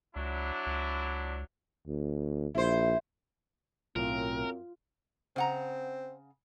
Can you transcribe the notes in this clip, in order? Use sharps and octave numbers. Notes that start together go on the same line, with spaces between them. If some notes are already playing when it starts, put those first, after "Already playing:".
C#2 F#3 D4 E4
C#2
D2
A#1 E4 C5
B1 F#2 A2 C4 F4 A#4
C#3 C4 F#5 A#5